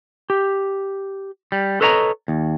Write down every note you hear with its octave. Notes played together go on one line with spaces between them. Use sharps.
G4
G3
A4 B4 C#5 D#5 A5 A#5
D#2